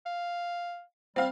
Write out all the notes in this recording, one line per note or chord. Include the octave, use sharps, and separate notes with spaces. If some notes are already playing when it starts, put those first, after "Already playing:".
F5
G3 C4 F5